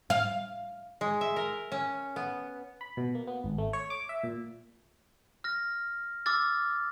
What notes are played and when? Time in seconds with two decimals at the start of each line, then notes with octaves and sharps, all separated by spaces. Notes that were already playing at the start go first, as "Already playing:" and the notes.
0.10 F5
1.01 G#3
1.21 E5
1.36 A#4
1.72 C#4
2.16 B3
2.81 B5
2.97 B2
3.15 A#3
3.27 B3
3.44 G#1
3.58 A3
3.73 C#5
3.90 D6
4.09 E5
4.23 A#2
5.44 F6 A#6
6.26 D6 E6 F6 A6